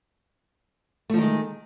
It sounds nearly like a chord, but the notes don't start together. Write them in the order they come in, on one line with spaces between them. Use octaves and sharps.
A3 F3 D#3 G#3